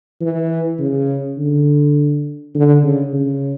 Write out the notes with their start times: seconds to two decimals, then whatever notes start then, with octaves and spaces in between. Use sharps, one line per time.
0.21 E3
0.79 C#3
1.38 D3
2.55 D3
2.83 C#3
3.13 C#3